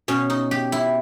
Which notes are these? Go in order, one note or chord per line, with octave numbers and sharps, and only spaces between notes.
B2 C#4
D#4
G4
E4